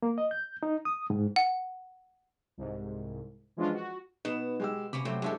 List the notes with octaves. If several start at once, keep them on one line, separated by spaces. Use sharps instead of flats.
A#3
D#5
G6
D#4
D#6
G#2
F#5
C2 G#2
E3 F3 G#3 C#4 D4 F4
F#4
B2 B3 D#4 E7
G#3 G4 E6
C3 A#3 C#4 B5 D6
F#3 A3 C4 G4
G2 G#3 E4 F#4 G4 A4